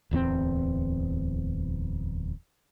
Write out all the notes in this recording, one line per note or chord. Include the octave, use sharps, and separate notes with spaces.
D1 E2 F#3 C4